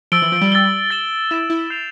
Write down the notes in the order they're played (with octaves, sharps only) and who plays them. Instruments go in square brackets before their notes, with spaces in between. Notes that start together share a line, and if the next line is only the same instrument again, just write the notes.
[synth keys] F3 [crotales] E6 A6 D7 G7
[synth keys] E3
F3
G3
[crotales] E6 A6 D7 G7
A6 E7 G7
[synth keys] E4 [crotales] A6 E7 G7
[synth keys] E4
[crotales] E6 G6 C7 F7